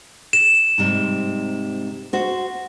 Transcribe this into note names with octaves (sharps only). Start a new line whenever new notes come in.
E7
G#2 C3 G3
F#4 C5